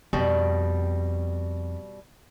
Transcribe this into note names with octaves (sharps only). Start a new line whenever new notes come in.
F2 B2 G3